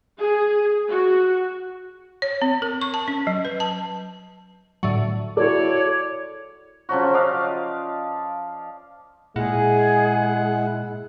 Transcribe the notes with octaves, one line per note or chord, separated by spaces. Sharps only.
G#4
F#4
C#5
C4
A#4
C#6
A5
C#4
F#3
B4
A5
A2 D3 F#3
E4 F#4 A4 C#5 D5
C#3 F3 F#3 F#4
D5 D#5 F5
A#2 G#3 E4 G#4 F#5